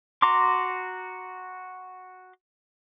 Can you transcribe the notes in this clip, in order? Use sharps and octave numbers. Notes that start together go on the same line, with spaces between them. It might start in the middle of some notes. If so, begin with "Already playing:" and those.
F#4 A#5 C6 D6